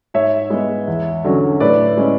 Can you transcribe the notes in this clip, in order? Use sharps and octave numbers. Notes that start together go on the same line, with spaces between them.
G#2 C#5 E5
G#3 B3
E2
D3 F#3 C#4
A2 B4 D5
G#3 C#4 E4